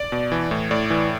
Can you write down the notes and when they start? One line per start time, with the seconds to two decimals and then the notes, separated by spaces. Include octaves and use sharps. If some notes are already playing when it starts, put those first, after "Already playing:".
Already playing: D5
0.12 B2
0.32 E3
0.51 A2
0.71 A2 D5
0.90 E3